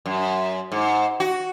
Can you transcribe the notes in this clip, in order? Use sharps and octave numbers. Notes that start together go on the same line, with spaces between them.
F#2
G#2
F#4